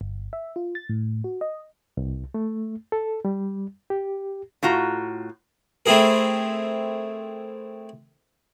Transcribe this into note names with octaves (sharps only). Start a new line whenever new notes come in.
G1
E5
F4
A6
A2
F#4
D#5
C2
A3
A4
G3
G4
A2 F4 F#4 A#5
A3 C4 E4 G#4 A#4